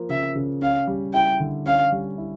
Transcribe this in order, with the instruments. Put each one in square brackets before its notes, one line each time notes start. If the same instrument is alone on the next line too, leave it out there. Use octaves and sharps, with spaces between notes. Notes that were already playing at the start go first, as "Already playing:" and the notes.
Already playing: [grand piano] F3 A#3
[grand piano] C#3 [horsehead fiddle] E5
[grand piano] C#3
[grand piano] C#4 [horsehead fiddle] F5
[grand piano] G3
[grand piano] E4 [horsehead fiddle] G5
[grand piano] D3
[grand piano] C#4 [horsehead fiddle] F5
[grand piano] G3
E4